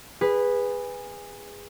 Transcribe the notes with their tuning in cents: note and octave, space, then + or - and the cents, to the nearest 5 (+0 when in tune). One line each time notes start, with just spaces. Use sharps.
G#4 -20 B4 +0